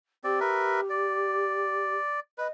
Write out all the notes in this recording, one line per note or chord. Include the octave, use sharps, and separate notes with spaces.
C4 G4 D5
A#4 B4 E5
D5
B4 D#5